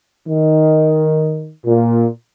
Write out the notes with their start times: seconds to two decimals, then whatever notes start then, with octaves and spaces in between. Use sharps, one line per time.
0.27 D#3
1.65 A#2